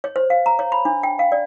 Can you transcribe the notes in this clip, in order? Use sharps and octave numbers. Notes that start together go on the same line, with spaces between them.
C#5
C5
F5
A#5
C#5
B5
D4
G5
F5
D5